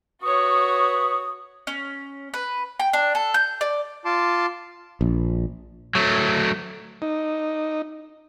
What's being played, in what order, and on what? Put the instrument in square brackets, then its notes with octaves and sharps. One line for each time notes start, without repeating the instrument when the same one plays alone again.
[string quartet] F#4 C#5 [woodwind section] B4 C#6 D#6
[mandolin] C#4
B4
G5
D4
A4
G6
D5
[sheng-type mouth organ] F4 A5 C6 D6
[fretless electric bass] A#1
[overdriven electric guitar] F#3 A3
[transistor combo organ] D#4